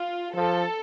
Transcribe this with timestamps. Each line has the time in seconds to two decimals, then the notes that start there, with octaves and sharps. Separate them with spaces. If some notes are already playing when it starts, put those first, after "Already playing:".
Already playing: F4
0.35 F3 A4